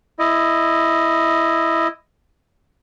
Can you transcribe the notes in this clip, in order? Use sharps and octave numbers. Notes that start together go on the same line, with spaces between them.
E4 D#5